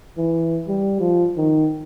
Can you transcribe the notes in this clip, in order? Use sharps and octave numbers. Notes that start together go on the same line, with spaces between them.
E3
G3
F3
D#3